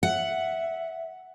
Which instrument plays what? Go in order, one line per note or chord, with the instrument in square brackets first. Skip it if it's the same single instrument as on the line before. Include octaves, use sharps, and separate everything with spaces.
[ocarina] E5 [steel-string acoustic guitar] F#5